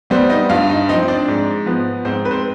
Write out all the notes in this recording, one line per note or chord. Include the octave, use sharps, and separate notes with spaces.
G3 B3 C4 C5
D#4 D#5
G2 F4 F5
D#4 D#5
F3 C4 D#4 D#5
D4 D5
G#2
F3 B3
G#2 C4 C5
B4
C4 C5